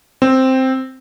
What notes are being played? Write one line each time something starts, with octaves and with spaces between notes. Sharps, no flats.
C4